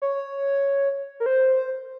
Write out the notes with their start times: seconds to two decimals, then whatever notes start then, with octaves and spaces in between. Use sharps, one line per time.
0.02 C#5
1.20 A#4
1.26 C5